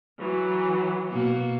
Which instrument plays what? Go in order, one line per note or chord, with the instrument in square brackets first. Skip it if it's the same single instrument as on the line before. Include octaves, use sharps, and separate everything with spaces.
[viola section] E3 F#3
[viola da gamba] B2 A#3 F#4